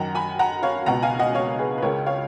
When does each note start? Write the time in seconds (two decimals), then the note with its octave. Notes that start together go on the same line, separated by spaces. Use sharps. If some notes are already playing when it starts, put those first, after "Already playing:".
Already playing: F#2 D#3 F#5 A#5
0.15 G#5 B5
0.39 F#5 A#5
0.63 C#5 F5
0.86 C#2 B2 F#5 A#5
1.03 F5 G#5
1.19 D#5 F#5
1.35 C#5 F5
1.59 G#4 B4
1.78 B4
1.82 C#2 C#3 A#4 C#5
2.06 C#5 F5